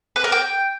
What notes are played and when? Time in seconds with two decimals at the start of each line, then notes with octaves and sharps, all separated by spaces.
0.16 B4
0.24 A#4
0.32 G5